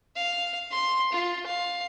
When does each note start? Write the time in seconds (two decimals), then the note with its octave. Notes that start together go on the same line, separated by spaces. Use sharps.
0.16 F5
0.72 C6
1.13 F4
1.47 F5